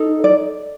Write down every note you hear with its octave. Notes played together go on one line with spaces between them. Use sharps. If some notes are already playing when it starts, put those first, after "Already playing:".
Already playing: D#4 A4
D5